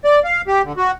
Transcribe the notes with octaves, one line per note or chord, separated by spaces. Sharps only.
D5
F5
G4
D3
F#4